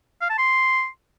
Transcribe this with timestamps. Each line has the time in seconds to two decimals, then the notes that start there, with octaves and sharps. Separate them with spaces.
0.21 F5
0.29 A5
0.38 C6